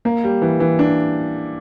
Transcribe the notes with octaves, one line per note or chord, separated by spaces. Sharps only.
A#3
G3
E3
E3
D4